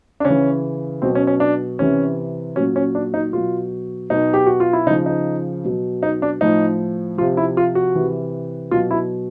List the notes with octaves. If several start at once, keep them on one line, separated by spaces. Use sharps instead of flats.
D4
C#3 C#4
E3
B2 F#3 C4
C#4
C#4
D4
C3 E3 C#4
A#2 F#3 C#4
C#4
D4
D#4
B2 F#3 F4
B2 F#3 D#4
G4
F#4
F4
E4
C#3 F3 D#4
D#4
B2 F#3
D#4
D4
A2 F3 D#4
C3 F3 F4
E4
F4
F#4
C3 E3
B2 F#3 F4
E4